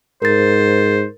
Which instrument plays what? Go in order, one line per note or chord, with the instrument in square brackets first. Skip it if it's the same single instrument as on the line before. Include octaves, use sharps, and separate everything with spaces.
[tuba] G#2 [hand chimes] A#4 A6 [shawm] C5